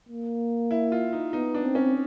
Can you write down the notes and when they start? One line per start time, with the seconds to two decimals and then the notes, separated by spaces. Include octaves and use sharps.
0.08 A#3
0.71 E4
0.92 F4
1.13 D#4
1.33 B3 D#4
1.54 D4
1.65 C4
1.75 C#4